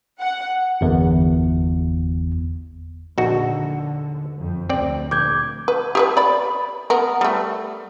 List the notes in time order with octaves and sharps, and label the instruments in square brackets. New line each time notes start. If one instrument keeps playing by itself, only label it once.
[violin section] F#5
[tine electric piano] G1 E2
[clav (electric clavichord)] A#1 D#4 F#4 [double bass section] D#2 D3
[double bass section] F2
[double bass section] D2 [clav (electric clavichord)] C4 D5
[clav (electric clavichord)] A#1 [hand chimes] D6 G6 G#6
[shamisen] B4
G4 G#4 B4
D5 B5
B3 A#4
G3 A3